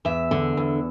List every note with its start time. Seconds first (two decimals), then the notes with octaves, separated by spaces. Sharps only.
0.05 E2 E5
0.31 D3
0.57 E2